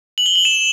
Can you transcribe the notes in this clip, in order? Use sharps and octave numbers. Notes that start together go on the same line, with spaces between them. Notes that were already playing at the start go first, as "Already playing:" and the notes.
F#7
G7
F#7
E7